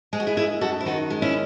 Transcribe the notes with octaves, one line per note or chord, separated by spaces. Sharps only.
G#3 G#4
F#4
E4 G#4
F#2 E4 G#4
F#2 F#4 A4
E4
D#3 D#4 F#4
G#3
C#4 E4